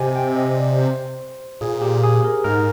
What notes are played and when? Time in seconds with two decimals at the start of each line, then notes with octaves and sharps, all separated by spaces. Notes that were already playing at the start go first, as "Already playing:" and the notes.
Already playing: C3 G4 C5 D#5 G#5
0.16 G5
0.36 D#5
0.57 D5
0.78 C5
1.61 A#2 G#4
1.82 G4
2.03 G#4
2.24 A#4
2.44 G#2 A#4